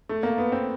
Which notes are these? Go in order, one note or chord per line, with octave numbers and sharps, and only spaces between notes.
A3
A#3
B3
C4